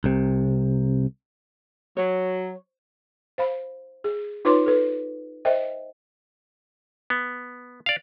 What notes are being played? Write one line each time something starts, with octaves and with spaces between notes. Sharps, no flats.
C2 C3
F#3 C#5
C5 F5 B5
G#4
D#4 F4 B4 C#5 C6 D6
A4 B4
A#4 C5 D#5 E5 G5
B3
D5 F5